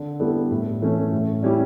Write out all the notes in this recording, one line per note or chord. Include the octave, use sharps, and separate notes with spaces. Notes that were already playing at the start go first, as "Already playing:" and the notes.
Already playing: D3
G3 B3 E4 A4
A2
E3 A3 C#4
A2
G3 C#4 E4 G4